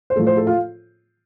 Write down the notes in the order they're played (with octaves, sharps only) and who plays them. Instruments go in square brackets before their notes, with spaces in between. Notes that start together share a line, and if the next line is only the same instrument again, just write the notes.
[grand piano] C5
A2 F3 A3 A4
C5
A4
F4